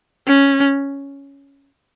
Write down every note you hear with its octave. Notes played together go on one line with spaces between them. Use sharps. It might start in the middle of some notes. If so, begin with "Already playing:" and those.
C#4